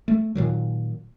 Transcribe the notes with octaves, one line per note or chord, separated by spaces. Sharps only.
A3
A#2 D#3 F#3